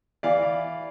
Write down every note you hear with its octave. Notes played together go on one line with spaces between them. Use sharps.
E3 D5 F5